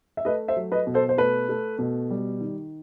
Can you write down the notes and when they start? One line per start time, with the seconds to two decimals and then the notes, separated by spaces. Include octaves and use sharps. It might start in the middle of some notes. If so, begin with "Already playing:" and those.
0.17 E5
0.25 A3 B4 D#5
0.48 C5 E5
0.57 F#3
0.72 B4 D#5
0.87 B2
0.94 A4 C5
1.09 C5
1.18 A3 B4
1.49 A3
1.79 B2
2.10 G3
2.41 D#3